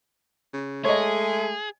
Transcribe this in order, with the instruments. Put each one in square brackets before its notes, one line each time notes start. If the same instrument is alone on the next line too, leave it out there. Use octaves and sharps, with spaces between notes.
[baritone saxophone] C#3
[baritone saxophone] G#3 [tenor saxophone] A3 [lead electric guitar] G#4 [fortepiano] C#5 D#5